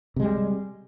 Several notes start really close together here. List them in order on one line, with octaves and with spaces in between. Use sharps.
C3 G#3 G3